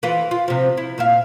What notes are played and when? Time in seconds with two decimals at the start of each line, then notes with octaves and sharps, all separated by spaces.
0.03 E3 F4 B4
0.31 F4
0.48 C3 F3
0.77 E4
0.98 A#2 E5 F5